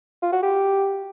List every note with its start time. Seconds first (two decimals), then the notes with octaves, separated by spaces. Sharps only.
0.22 F4
0.32 F#4
0.43 G4